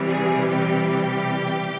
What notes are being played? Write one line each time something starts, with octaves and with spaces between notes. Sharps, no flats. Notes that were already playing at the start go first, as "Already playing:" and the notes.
Already playing: C3 E3 G3
G#4
G4